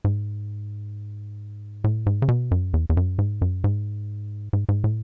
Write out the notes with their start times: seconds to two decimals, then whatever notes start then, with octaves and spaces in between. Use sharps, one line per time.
0.04 G#2
1.84 A2
2.06 G#2
2.22 C#3
2.28 B2
2.51 F#2
2.74 E2
2.90 E2
2.97 F#2
3.19 G#2
3.41 F#2
3.64 G#2
4.53 G#2
4.69 G#2
4.84 A2